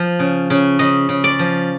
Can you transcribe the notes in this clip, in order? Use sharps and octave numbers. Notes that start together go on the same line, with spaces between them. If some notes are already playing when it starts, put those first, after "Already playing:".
Already playing: F3
C#3
C#3
C#3 D#5
C#3
D5
F3